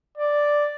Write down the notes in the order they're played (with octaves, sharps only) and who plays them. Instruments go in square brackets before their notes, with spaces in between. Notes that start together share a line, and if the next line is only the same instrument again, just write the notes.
[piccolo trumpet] D5